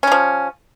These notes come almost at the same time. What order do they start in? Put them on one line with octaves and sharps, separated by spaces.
C#4 G3 F3